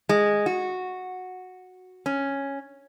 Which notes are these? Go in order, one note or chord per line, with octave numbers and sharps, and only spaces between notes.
G#3
F#4
C#4